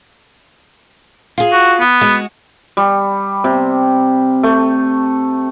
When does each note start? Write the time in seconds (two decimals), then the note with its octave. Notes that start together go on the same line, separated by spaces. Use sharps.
1.38 F4 G#4
1.53 F#4
1.80 B3
2.01 G#3 F#4
2.77 G3
3.44 C3
4.43 A3